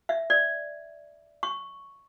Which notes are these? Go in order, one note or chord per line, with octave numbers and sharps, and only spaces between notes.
E5
D5
C#6